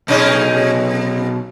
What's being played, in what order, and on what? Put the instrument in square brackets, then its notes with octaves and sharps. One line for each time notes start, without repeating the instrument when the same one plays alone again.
[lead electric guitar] B1 [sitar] C3 C#4 D#4